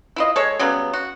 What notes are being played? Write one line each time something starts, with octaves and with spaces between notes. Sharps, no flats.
E4 F4 D#5
G#3 A4 C#5
C#3 F#3 G3 B3
F#4